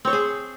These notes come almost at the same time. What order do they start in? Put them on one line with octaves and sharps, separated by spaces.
C4 C#5 C5 G#4